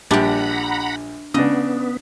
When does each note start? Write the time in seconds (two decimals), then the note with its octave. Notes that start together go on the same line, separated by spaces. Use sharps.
0.11 A#1 G3 D4 G4 F#5 A#5 B5
1.34 C#3 B3 D4 D#5